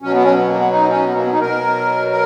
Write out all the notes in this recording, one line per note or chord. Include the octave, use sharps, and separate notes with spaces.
B2 F#3 C#4
B3
C#4
B3
A#3
B3
D#4
C#4
B3
A#3
B3
D#4
B2 F#3 A#4
A#4